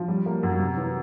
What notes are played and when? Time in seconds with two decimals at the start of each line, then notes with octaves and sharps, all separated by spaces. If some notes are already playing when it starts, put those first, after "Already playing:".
Already playing: F3
0.08 G3
0.26 A#3
0.43 F#2
0.60 C3
0.77 E3